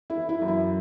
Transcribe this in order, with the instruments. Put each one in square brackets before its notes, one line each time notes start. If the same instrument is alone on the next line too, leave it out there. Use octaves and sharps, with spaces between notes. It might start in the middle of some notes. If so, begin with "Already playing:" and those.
[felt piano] E4
E3
E4
F#2
E4